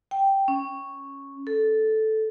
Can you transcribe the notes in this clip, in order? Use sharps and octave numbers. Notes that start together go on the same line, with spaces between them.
G5
C#4
A4